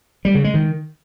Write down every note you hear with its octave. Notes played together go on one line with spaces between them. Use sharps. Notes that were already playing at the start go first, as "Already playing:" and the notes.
G3
C#3
G#3
D#3